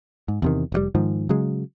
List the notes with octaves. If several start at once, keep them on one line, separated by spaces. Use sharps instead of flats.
G#2
E2 C3 D#3
F1 C3 G3
G#2 D#3 F3
C#3 F#3 G#3